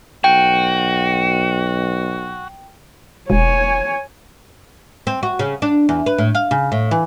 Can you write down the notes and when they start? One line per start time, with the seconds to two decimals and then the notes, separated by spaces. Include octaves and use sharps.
0.24 B1 F#4 G5
3.30 E1 C#5 G#5
5.07 C4
5.23 F#4
5.39 C#3
5.62 D4
5.89 E2
6.06 B4
6.18 A2
6.35 F5
6.51 C#3
6.72 A2
6.91 E3